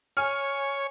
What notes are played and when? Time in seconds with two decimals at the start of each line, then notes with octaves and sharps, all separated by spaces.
0.17 C#5 G#5 F6